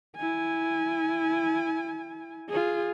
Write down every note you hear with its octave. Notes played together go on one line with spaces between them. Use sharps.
E4 G#5
F4 G#4